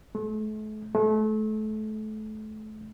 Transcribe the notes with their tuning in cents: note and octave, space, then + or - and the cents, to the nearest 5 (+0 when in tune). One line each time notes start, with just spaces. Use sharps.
A3 -40
A3 -30